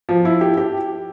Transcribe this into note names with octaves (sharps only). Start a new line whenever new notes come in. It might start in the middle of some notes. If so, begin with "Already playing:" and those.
F3
E4
G4
G4